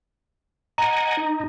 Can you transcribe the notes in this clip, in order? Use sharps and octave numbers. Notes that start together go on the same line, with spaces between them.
D#5 F#5 G#5 A#5
D#4